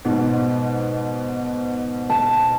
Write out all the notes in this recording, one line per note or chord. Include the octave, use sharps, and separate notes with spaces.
G#2 B2
A5